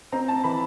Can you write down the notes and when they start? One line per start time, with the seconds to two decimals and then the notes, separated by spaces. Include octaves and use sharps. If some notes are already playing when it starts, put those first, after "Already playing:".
0.12 C4 A#5
0.28 A5
0.44 E3 B5